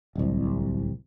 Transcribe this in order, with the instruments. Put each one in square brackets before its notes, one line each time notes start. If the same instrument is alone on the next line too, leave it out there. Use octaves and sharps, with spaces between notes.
[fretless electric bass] D1 C2